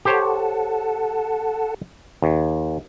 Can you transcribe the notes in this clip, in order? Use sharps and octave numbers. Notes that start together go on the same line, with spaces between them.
G4 A4 C5 C#5 F#5 A5
D#2